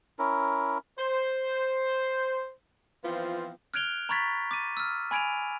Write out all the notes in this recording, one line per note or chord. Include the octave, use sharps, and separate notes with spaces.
C#4 E4 A#4
C5
E3 F3 B3 C4 F4
F6 F#6 G#6 D7 F7 G7
A#5 B5 C#6 G#6 A6 B6
D6 A6 D#7
E6 F6
G#5 B5 G#6 D7 D#7 F7